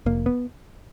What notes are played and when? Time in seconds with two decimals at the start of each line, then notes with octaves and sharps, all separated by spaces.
0.06 F1 A#3
0.26 B3